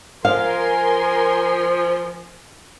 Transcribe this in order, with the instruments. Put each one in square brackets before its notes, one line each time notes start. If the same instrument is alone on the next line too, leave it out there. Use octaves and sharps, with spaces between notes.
[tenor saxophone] F3 [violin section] A#4 G#5 C6 [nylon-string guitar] F5